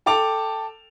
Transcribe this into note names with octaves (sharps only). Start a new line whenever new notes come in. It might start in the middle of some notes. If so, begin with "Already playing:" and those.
A4 G5 A5 D6 F7